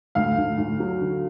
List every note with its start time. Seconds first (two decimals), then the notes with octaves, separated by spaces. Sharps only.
0.15 D2 F5
0.38 D2
0.58 D2
0.80 F#3
1.01 D3